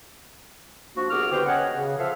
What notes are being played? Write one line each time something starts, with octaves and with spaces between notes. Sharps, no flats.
F3 A#3 D4 F#4
C2 B3 F#4 G#4 D6 F6
B2 D3 G4 B4 C5 G5
B3 C#4 C#5 D#5 F#5
C#3
F3 A4 E5 F5